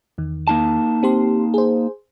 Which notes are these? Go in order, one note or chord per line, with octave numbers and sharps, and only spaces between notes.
E2 D#3
A#3 D#4 A5
C4 G4 C6
G#4 C5